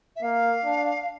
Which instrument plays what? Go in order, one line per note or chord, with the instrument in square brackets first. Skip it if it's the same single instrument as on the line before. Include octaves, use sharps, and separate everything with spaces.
[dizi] E5
[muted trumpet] A#3 [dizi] F5
[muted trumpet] D4